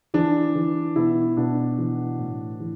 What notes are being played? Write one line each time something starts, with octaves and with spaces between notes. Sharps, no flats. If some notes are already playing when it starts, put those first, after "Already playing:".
E3 D4
E3
B2 E4
B2 D4
E3
A2
E3